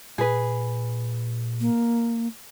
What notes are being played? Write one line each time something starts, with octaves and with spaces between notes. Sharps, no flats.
A#2 G#4 B4
A#3